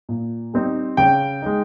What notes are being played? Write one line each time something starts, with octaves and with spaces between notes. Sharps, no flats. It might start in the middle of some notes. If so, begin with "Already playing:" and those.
A#2
G3 C4 D#4
C#3 G5
G#3 D#4